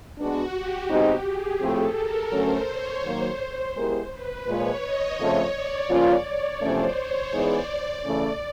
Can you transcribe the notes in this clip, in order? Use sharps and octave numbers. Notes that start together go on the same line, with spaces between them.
G#3 B3 D4 F#4
G4
B2 G#3 C4 D#4
G#4
A2 F3 A3 C4 A4
A#4
D3 F#3 A3 C#4 C5
C#5
D#3 F#3 A#3 C5
G#3 B3 E4 G4 A#4
B4
A#2 F3 G#3 C#5
D#5
F2 C#3 F3 A3 C#5
D5
C#3 F3 A#3 C#4 F4
C#5
E2 C3 F3 A3 C#4 C5
C#5
E3 G#3 B3 D#4 G#4 D5
D5
C#3 E3 A3 C#4